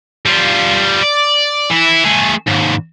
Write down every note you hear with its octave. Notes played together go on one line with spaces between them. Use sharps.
G3 F4
D5
E3 E4
A3 G#4
D#2 G#2